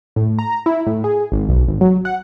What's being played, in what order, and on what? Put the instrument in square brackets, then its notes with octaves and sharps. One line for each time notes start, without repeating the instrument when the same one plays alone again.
[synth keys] A2
A#5
E4
A2
G#4
G#1
B1
G#1
F#3
F#5